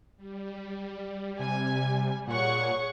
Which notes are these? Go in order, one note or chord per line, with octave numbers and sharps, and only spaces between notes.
G3
C3 G#5
A#2 G#4 C#5 F#5 C#6